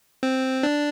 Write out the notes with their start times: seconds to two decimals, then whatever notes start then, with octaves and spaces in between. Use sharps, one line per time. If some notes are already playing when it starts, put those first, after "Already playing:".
0.23 C4
0.63 D4